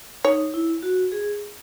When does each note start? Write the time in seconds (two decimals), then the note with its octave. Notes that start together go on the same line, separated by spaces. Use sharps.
0.25 D#4 C#5
0.54 E4
0.83 F#4
1.12 G#4